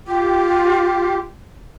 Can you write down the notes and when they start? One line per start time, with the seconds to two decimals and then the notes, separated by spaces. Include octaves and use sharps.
0.07 F4 G4